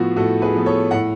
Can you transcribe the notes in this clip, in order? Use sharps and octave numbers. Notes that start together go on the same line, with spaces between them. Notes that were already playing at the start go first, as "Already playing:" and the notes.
Already playing: A2 F3 B3 F4 F#4
A2 F#4 A4
G#4 B4
F3 B3
A4 C#5
A2 F#5